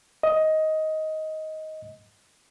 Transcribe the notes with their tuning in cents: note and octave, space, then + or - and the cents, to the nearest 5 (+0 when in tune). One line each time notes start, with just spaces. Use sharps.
D#5 +15